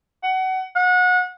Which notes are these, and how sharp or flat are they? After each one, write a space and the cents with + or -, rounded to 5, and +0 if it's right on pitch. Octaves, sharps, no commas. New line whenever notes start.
F#5 +25
F#5 -30